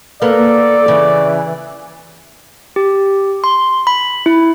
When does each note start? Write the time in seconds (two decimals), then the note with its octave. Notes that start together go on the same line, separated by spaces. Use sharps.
0.22 A#3 B3 A4 D5
0.88 C#3 E3
2.76 G4
3.44 C6
3.87 B5
4.26 E4